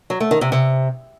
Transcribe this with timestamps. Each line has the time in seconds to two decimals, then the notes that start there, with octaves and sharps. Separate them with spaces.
0.10 F#3
0.20 A3
0.31 D#3
0.41 C3
0.52 C3